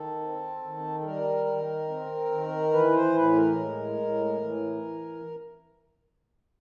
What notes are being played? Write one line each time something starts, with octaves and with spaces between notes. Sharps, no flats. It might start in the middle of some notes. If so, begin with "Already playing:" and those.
Already playing: D#3 A4
C4
D#3
A4
G3 A#4
D#3
C4
D#3
E3 B4
C5
A2 B4
A#4
G#3
A2
E3